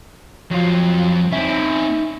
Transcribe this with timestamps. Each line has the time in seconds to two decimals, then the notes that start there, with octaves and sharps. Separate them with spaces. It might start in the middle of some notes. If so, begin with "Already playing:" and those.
0.51 F2 F#3 F4
1.32 C4 C#4 D#4 E5